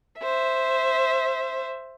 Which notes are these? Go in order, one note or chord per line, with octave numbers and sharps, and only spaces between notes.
C5 E5